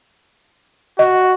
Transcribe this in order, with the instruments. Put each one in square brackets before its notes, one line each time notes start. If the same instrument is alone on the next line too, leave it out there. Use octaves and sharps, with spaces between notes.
[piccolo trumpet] F#4 [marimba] D#5